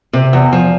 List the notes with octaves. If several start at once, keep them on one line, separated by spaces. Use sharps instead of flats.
C3
E2
F3